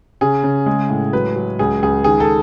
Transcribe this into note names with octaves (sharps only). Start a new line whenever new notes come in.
C#3 G#4
C#3
G#3
A2
F#3 B4
F#3
C#2 G#4
C#2 G#4
D#3 G#4
A4